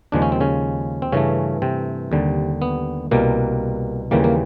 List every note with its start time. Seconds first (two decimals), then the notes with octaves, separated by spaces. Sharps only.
0.12 D#2 C#3 F3 G#3 D4
0.22 C#4
0.32 C4
0.40 C#3 C#4
1.02 C4
1.12 G2 C#3 E3 A3 C#4
1.62 C3 C4
2.12 D#2 D3 G3
2.62 B3
3.11 C2 B2 G3 A#3
4.11 D#2 C#3 E3 G3 A#3
4.24 A#3